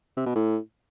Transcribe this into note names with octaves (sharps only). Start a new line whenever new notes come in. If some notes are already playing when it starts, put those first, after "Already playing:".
C3
B2
A2